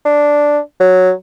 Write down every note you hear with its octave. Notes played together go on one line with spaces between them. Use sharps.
D4
F#3